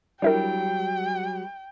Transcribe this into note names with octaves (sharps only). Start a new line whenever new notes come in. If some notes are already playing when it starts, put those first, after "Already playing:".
F#3 G3 D4 E4 A#4 G5